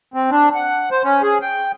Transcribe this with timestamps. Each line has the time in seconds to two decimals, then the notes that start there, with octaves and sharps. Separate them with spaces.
0.14 C4
0.31 D4
0.55 F#5
0.91 C5
1.04 C#4
1.22 G#4
1.42 G5